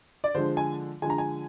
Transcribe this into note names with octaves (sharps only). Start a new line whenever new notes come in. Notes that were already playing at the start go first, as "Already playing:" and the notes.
D5
D3 F3 G#3 C5
G#5
D3 F3 G#3 G#5
A#5
G#5